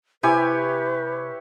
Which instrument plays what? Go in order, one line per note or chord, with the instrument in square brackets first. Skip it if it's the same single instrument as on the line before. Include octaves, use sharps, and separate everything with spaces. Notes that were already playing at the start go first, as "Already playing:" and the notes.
[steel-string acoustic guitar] C3 G#5 [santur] E4 G4 C#5 [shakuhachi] B4